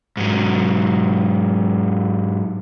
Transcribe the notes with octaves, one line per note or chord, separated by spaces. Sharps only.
G#2 F#3